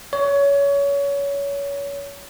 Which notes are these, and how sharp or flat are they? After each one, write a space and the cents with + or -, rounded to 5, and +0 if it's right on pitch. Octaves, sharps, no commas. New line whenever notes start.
C#5 +25